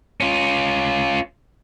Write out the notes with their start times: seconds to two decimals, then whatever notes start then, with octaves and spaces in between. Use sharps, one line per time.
0.21 C#4 F4